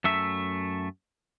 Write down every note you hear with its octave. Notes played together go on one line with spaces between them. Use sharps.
F#2 A3 E5